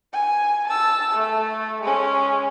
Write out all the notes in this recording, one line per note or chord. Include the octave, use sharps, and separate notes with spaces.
G#5
A5 E6
A3
G#3 C#4